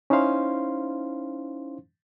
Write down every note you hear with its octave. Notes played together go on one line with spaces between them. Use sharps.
C#4 D#4 E4 C5 F5 C6